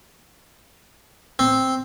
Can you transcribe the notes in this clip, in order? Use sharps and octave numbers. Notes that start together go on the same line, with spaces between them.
C4